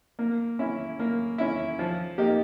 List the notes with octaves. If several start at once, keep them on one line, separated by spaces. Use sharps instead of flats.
A#3
C#4 E4
A#3
C#4 E4
F3
A#3 D#4 G4